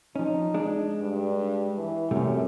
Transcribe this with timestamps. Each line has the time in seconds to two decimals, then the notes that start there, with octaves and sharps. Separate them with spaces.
0.16 F3 C#4 D#4
0.54 G#3 D4
1.01 G2
1.78 E3
2.11 F#2 C3 G3 A3